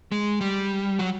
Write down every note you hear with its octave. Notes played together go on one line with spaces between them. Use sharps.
G#3
G3
F#3